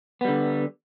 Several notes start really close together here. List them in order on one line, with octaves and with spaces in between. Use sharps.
B3 G3 D3